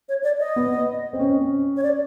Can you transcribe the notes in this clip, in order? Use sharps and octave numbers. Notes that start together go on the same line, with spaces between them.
C#5
D5
D#5
B3
C4
C#4
C#5
D5